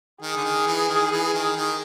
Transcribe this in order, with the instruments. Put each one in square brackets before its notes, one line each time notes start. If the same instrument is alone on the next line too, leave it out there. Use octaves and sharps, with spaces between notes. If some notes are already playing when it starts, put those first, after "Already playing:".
[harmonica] D#3 [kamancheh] G#4
[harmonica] D3
D#3
E3
D#3
E3
D#3
D#3